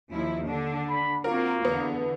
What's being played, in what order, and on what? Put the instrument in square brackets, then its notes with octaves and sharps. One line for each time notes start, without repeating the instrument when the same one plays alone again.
[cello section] D#2 F3 E4
D3 D4
[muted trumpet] B5
[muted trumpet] A#3 [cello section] C4 F4 F#4 [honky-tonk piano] A#4
[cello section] E2 D3 [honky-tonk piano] B3